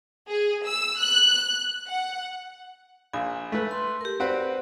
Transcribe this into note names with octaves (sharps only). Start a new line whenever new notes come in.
G#4
E6
F#6
F#5
A#1 G#5
A3 B4
C6
G4 A#4
C4 F#4 G4 B4 C5 D5